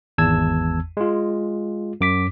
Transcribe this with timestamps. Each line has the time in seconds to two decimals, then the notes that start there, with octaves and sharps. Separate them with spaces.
0.18 G#1 E2 A5 E6 G#6
0.97 G#3 F4
2.01 F#2 D6 B6